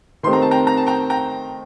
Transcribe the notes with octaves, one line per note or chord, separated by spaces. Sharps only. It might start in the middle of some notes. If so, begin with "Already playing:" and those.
D#3 A3 C4 G4 C6
A#5
A5
G5 A#5
A#5
A5
G5 A#5
G5 A#5